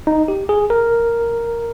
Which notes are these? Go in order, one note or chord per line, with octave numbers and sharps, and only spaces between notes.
D#4
G4
G#4
A#4